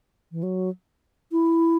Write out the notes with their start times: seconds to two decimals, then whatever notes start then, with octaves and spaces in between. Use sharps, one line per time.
0.32 E3
0.43 F#3
1.32 E4